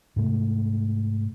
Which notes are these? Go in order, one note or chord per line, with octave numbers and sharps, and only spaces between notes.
G#2 C3 A3